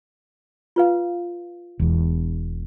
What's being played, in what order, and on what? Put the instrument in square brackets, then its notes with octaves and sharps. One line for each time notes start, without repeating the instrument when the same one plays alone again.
[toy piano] F4 B4 F5
[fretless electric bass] E1 E2